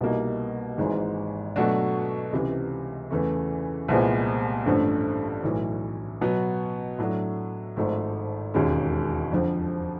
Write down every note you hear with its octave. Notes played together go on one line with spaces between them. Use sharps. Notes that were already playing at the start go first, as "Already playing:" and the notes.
C2 B2 G3 A#3 D#4
G#1 G#2 E3 G#3
B2 F#3 A3 D4 F#4
C#2 C3 E3
E2 C#3 E3 A3
C2 A#2 F3 G#3 B3
A1 G2 D3 F3 A3
B1 A2 E3
B2 F#3 B3
A2 F#3 A3 D4
G#1 G#2 F3 A3
E1 D#2 D#3 G#3 C#4
F2 D3 F3